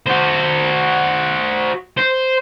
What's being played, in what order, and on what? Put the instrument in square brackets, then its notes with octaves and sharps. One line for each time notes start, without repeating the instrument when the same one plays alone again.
[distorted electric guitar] F#4 C5
C5